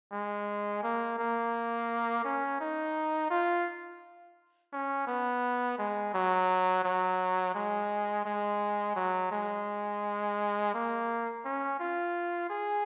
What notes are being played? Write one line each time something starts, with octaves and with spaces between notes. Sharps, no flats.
G#3
A#3
A#3
C#4
D#4
F4
C#4
B3
G#3
F#3
F#3
G#3
G#3
F#3
G#3
A#3
C#4
F4
G#4